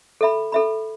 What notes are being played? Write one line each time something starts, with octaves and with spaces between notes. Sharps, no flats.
A4 E5 B5
A4 E5 B5